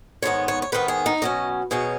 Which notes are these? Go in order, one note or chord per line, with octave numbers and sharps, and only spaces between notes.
G#2 D#3 B3 C#5
C#5
C#5
G#2 D#3 B3 B4
G#4
D#4
B2 F#3 C#4 D#5
B2 F#3 C#4 G#4